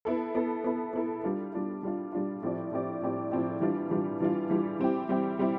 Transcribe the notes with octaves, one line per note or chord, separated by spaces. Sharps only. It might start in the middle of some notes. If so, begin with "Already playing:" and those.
B3 E4 A4
B3 E4 A4
B3 E4 A4
B3 E4 A4
G3 D4 F4
G3 D4 F4
G3 D4 F4
G3 D4 F4
A2 F3 C4 G4 D5
A2 F3 C4 G4 D5
A2 F3 C4 G4 D5
A2 F3 C4 G4 D5
E3 G3 D4 F4
E3 G3 D4 F4
E3 G3 D4 F4
E3 G3 D4 F4
G3 C4 E4 G4
G3 C4 E4 G4
G3 C4 E4 G4